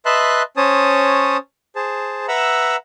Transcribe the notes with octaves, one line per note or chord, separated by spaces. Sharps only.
B4 D#5 E5 A5 C6 F#6
C#4 C5 C#5 A5 D#6
G#4 C5 A5
B4 E5 F#5 A#5 B5 E6